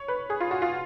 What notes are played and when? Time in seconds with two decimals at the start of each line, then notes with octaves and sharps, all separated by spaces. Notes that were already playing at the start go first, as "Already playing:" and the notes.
Already playing: C#5
0.08 B4
0.30 G#4
0.40 F4
0.51 F#4
0.62 F4